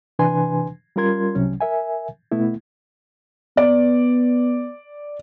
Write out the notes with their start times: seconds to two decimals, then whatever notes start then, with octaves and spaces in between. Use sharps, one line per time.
0.19 C3 E3 D4 B4 G#5 C6
0.96 G3 C#4 F4 A#4 C6 G#6
1.35 C2 C3 F#3 C#4
1.61 A#4 E5 G#5
2.32 B2 A3 B3 E4
3.57 B3 D5